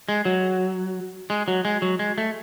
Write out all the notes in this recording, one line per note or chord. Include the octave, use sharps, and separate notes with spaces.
G#3
F#3
G#3
F#3
G#3
F#3
G#3
A3